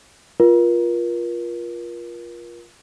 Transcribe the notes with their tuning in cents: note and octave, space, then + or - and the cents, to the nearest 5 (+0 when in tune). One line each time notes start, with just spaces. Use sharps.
F4 +0 A#4 +35